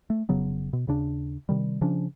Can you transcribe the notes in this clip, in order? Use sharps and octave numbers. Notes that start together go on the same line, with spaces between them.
A3
F1 C#3 F#3 B3
B2
D#2 C#3 D4
C3 D#3 G3
C#3 F3 C#4 D4